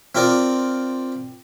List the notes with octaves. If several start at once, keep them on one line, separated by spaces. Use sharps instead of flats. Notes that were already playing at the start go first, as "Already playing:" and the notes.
C4 F4 A#4 D5